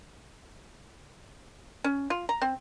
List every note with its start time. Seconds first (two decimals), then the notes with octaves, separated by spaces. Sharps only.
1.84 C#4
2.10 F4
2.29 A#5
2.42 C4